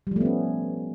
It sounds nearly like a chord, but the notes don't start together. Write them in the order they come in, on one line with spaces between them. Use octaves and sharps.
G3 F3 A3 B3 C#4